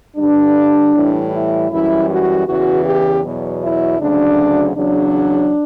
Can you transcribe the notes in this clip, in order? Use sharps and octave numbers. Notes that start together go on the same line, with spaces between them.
G2 D3 G3 D4
A2 E3 G3
E4
F#2 E3 G3 E4
F#4
E2 C#3 E3 F#4
G4
E2 B2 F#3
E4
D2 C#3 F#3 D4
E2 C#3 F#3 D4